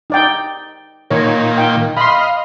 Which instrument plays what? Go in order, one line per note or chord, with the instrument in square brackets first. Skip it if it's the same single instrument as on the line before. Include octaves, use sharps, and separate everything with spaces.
[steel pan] D#4 D5 G5
[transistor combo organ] A#2 D#3 [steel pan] C#5
[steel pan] G5
[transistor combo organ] D#5 F5 [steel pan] B5 C6